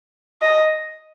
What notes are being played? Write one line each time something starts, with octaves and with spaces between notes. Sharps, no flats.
D#5